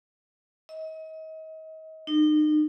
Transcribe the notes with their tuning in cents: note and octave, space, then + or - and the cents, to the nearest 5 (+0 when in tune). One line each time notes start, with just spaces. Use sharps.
D#5 +35
D#4 -40